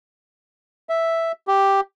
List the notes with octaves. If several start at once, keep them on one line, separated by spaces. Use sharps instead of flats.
E5
G4